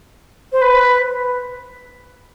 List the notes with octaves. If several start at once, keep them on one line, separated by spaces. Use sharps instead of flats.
C5
B4